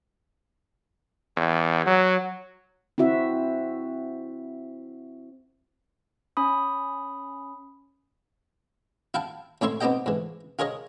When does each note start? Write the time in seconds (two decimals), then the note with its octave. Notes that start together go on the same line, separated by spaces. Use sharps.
1.37 E2
1.86 F#3
2.98 C4 E4 F#4 E5
6.37 C#4 B5 D#6
9.14 E4 F5 G5 A5
9.61 A2 C#4 E4 C#5 E5 C6
9.81 B3 C4 D#4 G4 D#5 G5
10.06 G#2 E3
10.59 F4 G#4 A#4 C#5 D#5